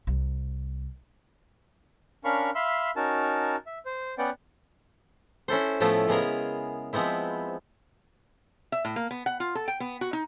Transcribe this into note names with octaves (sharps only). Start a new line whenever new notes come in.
C2
C#4 D4 A#4 F5 B5 C#6
E5 F5 B5 C6 E6
C#4 D#4 F#4 A#4 A5
E5
C5
B3 C#4 B4 D5 F#5 G5
C#4 E4 A4 C5
A2 F3 A3 B3 E4
C#3 G#3 B3 G#4 A#4
F3 G#3 B3 C4 E4
E5
A2
A#3
B3
F#5
F4
A4
G5
B3
F#4
D#4